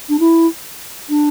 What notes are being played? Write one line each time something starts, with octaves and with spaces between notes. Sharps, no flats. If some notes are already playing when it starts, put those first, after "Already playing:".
D4
E4
D4